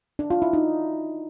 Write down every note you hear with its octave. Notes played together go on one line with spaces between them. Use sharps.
D4
F4
E4
D#4